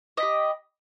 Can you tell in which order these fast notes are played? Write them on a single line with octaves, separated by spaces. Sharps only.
D#5 B5 G4